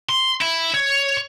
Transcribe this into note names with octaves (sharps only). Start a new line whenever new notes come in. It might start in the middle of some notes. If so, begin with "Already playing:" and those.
C6
E4
C#5